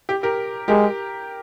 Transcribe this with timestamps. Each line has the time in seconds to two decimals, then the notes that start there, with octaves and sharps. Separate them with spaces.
0.09 G4
0.23 G4 A#4
0.68 G#3 G4 A#4